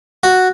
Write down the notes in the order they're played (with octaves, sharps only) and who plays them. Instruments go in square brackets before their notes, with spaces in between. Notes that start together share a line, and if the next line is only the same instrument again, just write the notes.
[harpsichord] F#4